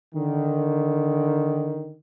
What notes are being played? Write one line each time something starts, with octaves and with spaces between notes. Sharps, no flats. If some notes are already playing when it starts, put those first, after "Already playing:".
D3 D#3